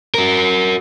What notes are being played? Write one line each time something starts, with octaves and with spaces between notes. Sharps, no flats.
F#4 A#4